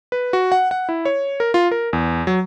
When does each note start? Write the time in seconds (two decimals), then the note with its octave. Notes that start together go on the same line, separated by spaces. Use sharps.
0.12 B4
0.33 F#4
0.52 F#5
0.71 F#5
0.89 E4
1.05 C#5
1.40 A#4
1.54 F4
1.71 A#4
1.93 E2
2.27 F#3